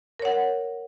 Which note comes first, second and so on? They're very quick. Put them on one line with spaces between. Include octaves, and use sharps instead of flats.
A#4 C#5 F#5